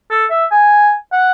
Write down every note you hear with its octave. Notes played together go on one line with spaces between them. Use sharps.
A4
E5
G#5
F#5